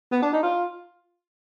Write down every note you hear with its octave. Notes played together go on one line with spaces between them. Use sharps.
B3
D4
D#4
F4